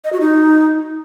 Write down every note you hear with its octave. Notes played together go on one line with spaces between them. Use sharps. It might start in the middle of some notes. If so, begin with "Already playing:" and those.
D#5
F#4
D#4